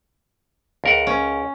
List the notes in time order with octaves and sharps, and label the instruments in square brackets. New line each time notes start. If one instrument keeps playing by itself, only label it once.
[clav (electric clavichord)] C#2 A#4 F#5
[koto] C#4